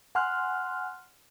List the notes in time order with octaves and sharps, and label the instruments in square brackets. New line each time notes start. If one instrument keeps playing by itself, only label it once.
[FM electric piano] F#5 G#5 C6 F6 F#6